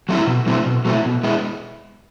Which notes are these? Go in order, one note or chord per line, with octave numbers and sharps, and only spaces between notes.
F#3 A3 C4 E4
B2
F#3 A3 C4 E4
B2
F#3 A3 C4 E4
B2
G#3 B3 E4